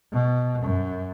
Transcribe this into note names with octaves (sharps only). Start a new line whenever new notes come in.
B2
F#2